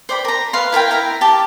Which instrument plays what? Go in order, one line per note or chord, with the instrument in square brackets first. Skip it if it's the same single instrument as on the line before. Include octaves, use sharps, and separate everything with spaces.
[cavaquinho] C5 D5 G5 B5
A#4 A#5
B4 F5 C6
E4 A#4 F5 G5
E4 A#4 E5 A#5
G4 G5 A5